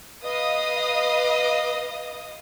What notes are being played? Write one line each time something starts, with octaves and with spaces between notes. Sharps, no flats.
B4 D#5 F5 D#6